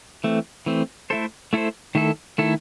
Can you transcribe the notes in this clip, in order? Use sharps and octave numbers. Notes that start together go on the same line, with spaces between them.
E3 A3 C4
E3 A3 C4
A3 E4 A4 C5
A3 E4 A4 C5
D#3 A3 E4 A4
D#3 A3 E4 A4